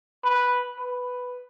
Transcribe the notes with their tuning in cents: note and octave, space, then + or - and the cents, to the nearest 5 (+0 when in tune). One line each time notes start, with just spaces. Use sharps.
B4 -5
B4 +5